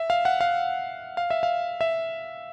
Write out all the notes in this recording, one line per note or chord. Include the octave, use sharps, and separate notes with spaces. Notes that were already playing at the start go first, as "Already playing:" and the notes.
Already playing: E5
F5
F#5
F5
F5
E5
F5
E5